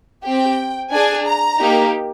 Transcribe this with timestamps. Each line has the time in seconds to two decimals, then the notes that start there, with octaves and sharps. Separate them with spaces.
0.23 C4 G4 G5
0.92 D4 G#4 G#5
1.26 A#5
1.60 A#3 D#4 G4